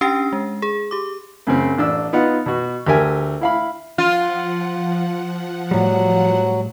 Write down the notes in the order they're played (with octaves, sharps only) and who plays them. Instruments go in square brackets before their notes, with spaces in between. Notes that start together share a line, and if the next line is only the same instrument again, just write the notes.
[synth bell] C#4 D4 G4 G5 A#6 C7
G#3
G#4
G4 D6
[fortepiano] F#2 C#3 C4
A1 D4 E6
B3 D#4 F4 F#5
B2 F#4
D2 G4 A#4 E5 G#5
E4 F5 B5
[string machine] F3 F#5 [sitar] F4
[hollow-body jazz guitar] A2 G3 [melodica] F#3